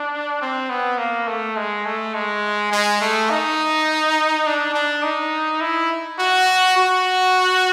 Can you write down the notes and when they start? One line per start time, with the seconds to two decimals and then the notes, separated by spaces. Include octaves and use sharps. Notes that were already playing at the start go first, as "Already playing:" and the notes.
Already playing: D4
0.41 C4
0.70 B3
0.98 A#3
1.28 A3
1.57 G#3
1.85 A3
2.14 G#3
2.72 G#3
3.01 A3
3.30 D#4
4.46 D4
4.74 D4
5.03 D#4
5.61 E4
6.19 F#4
6.77 F#4